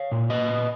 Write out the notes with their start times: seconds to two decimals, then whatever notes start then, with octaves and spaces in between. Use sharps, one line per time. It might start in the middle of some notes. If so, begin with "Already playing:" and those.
Already playing: C#5 F5
0.12 A#2
0.30 A#3 B4 D#5
0.48 A#2